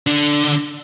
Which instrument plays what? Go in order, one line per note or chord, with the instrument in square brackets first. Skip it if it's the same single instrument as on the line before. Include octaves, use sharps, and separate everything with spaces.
[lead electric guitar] D3 D4